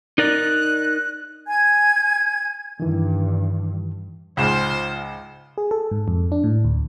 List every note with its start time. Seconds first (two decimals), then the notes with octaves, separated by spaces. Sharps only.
0.18 D#4 A#4 D5 F#6
1.48 G#5 G#6
2.80 G2 D#3 E3
4.37 C#2 G#2 F4 C5
5.58 G#4
5.71 A4
5.91 G#2
6.08 F2
6.32 D4
6.44 A2
6.65 D2